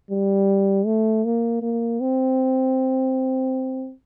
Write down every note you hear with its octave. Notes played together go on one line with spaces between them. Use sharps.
G3
A3
A#3
A#3
C4